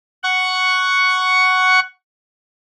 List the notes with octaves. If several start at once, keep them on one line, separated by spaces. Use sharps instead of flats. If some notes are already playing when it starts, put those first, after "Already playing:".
F#5 C#6